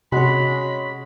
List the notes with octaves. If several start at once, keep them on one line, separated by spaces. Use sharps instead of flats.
C3 G#3 C#4 F#4 C#5 B5